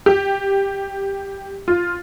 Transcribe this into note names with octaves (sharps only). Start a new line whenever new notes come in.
G4
F4